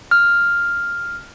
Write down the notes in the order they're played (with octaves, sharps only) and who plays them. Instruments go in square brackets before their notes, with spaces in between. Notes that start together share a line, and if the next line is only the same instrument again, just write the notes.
[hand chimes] F6